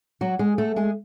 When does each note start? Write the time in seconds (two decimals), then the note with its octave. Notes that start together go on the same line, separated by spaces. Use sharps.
0.21 F#3 F#4
0.39 G#3 G#4
0.58 A3 A4
0.76 G#3 G#4